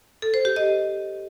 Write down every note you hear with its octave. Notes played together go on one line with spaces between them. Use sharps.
A4
C5
G4
D#5